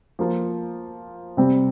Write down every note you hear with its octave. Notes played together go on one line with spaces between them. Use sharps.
F3 A#3 F4
C3 G3 C4